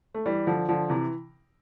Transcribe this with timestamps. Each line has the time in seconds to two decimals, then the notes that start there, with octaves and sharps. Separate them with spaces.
0.15 A3
0.26 E3 G3
0.47 D3 F3
0.69 D3 F3
0.89 C3 E3